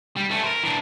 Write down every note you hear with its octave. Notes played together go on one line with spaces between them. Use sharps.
G3
A3 C#4
A#4 C5
E3 D4